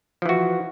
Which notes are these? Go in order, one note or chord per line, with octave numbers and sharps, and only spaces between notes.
E3 F3 F#4